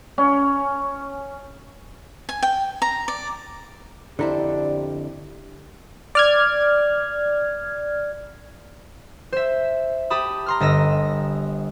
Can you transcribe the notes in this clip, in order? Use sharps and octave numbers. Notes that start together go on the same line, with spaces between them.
C#4
G#5
G5
A#5
D5
F2 D3 D4 E4 G4 A4 C5 A#5
D5 F6 G#6
C5 E5
G4 A5 B5 D#6
A#5 C6 F6
G1 D#5 E6 A#6